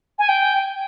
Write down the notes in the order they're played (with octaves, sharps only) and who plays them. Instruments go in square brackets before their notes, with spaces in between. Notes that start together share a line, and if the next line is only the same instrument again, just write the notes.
[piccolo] G#5
G5